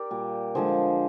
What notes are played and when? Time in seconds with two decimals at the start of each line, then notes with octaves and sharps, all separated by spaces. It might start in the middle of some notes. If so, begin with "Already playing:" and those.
Already playing: G4 A#4 D5
0.10 A#2 G3
0.55 D3 F3 G#3 G#4 C5